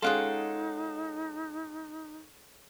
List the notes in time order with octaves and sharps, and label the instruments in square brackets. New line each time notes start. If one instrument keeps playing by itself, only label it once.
[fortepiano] G#3 C#4 G#4 [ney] D#4 [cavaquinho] F4 F#5 G5 [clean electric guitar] A4